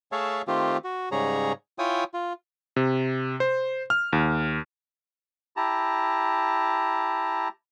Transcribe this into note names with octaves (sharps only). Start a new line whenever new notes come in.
A3 G#4 C#5 E5 F5 A5
D#3 A3 C4 F4 G4
F#4
G#2 C#3 G3 G#4 C#5 A#5
E4 F4 C#5 G5 G#5 D#6
F4
C3
C5
F6
D#2
E4 G4 A5 A#5